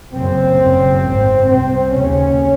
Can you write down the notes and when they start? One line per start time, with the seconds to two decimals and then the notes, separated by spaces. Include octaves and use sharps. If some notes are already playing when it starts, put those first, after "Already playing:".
0.14 F#1 F#2 C#3 C4
0.60 F#1 F#2 C#3
1.05 G#1 G#2
1.49 C2 C3 C4
1.93 D#2 C#3 C#4